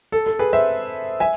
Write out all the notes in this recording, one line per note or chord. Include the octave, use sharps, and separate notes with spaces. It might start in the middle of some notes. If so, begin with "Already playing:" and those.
A4
A4
G#4 B4
C5 E5
E5 G#5